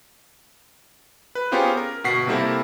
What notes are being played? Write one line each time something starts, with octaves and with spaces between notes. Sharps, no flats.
B4
B3 C#4 F4 G4 G#4 C5
A#4
G1 B2 F#5 C#6 B6 C7
C3 G3 A#3 E4 A4 A#4